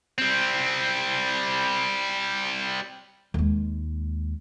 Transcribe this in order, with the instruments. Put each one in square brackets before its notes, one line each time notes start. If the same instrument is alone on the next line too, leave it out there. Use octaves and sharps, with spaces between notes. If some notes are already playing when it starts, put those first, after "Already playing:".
[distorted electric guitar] G3 C4
[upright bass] D#2 G#3